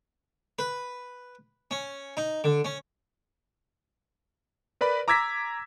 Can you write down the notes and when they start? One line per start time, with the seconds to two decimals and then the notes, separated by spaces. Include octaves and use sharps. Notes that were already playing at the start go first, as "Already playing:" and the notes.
0.59 B4
1.71 C#4
2.17 D#4
2.44 D3
2.65 C#4
4.81 A#4 B4 D5 B5
5.08 A#5 D6 E6 G#6 A#6 B6